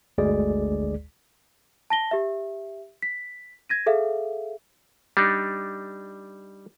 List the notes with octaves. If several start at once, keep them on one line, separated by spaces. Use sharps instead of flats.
G1 D2 G#3 G#4 D5
A5 A#6 G7
G4 E5
B6
G#6 A#6 D#7
G#4 A4 E5 F5
G3 D4 D#4